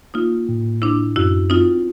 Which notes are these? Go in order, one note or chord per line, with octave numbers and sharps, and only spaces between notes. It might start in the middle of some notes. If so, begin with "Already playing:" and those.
A#3 D#4 F4
A2
G1 D4 E4
F#2 E4 F#4
C4 D#4 F4